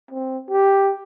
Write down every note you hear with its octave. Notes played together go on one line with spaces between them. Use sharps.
C4
G4